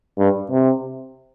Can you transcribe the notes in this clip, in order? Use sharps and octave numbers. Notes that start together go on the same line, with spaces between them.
G2
C3